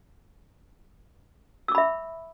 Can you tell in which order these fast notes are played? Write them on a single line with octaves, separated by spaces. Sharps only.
E6 D6 B5 E5